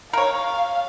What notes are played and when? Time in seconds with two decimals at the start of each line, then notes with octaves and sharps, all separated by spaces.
0.13 A#4 C#5 F5